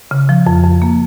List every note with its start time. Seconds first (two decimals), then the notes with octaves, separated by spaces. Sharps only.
0.11 C#3
0.29 F3
0.47 F2
0.64 F2
0.82 A#3